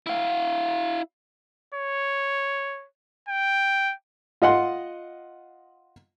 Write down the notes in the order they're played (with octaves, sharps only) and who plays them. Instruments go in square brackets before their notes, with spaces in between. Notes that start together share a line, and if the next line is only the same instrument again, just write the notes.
[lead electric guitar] E4 F5
[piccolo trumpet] C#5
G5
[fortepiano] F4 D#5 F#5 C6